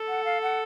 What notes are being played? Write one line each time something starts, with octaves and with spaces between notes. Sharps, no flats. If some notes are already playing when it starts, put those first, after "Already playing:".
Already playing: A4
F#5
F5
F#5